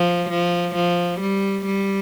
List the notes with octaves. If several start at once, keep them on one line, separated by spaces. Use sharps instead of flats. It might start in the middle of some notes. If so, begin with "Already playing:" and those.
Already playing: F3
F3
F3
G3
G3